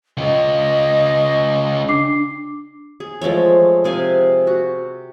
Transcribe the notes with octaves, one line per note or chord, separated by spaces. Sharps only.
C#3 F4 D#5
D4 D6 C7
G#4
F3 G#3 A3 C#5
C3 G#4 F5 G#5
F#4